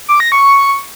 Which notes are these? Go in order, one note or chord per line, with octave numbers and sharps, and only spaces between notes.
D6
A#6
C#6